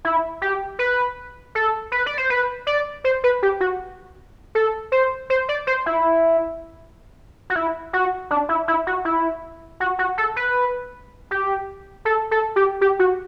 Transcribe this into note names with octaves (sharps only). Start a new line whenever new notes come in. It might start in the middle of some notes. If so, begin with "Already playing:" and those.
E4
G4
B4
A4
B4
D5
C5
B4
D5
C5
B4
G4
F#4
A4
C5
C5
D5
C5
E4
F#4
E4
F#4
D4
E4
E4
F#4
E4
F#4
F#4
A4
B4
G4
A4
A4
G4
G4
F#4